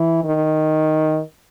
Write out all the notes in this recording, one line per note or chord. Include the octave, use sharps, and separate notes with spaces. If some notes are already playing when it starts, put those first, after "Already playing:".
Already playing: E3
D#3